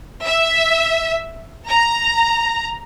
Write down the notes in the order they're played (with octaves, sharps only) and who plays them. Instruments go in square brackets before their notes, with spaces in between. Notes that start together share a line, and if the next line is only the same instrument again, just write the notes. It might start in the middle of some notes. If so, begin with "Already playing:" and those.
[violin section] E5
A#5